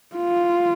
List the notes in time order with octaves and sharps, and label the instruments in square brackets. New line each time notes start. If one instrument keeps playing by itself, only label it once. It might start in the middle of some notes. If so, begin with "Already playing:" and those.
[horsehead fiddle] F4